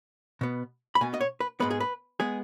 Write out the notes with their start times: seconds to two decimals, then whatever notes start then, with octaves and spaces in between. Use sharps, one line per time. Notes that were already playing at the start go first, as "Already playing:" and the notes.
0.41 B2 B3
0.95 B5
1.01 B2 B3 G#5
1.14 D#5
1.21 C#5
1.40 B4
1.60 G#2 G#3 B3 B4
1.70 G#4
1.80 B4
2.20 G#3 B3 G#4